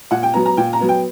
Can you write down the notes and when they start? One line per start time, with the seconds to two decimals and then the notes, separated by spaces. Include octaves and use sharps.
0.11 A#2 F#5
0.23 G5
0.34 F#3 B3 A#5
0.46 A#5
0.57 A#2 G5
0.73 A#5
0.80 F#3 B3
0.89 G5